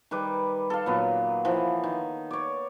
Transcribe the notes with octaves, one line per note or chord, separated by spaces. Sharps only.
D#3 G3 B4 D6
A4 F5
A#2 F#3 B3
E3 F3 E4
D#3
C#5 D5